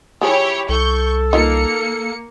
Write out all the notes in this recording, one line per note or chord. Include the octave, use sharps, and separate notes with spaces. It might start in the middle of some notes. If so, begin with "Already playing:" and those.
F3 E4 G4 G#4 C#5
C2 A4 C#6 G6
A#3 D#4 F4 A#4 C#7